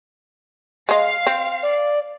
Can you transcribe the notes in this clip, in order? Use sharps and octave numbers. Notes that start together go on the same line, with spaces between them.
G#3 D#5 F5
C4
D5